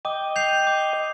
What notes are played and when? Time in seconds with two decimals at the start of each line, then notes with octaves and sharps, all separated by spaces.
0.05 D#5 G5 D6
0.36 G6 C7 F7
0.67 D6